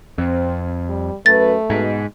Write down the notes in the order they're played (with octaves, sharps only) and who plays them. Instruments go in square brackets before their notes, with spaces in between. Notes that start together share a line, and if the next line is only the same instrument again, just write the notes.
[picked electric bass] F2 [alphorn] C4
[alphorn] G3
[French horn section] F#2 B4 [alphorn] A3 [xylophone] A6
[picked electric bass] G#2 [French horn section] B2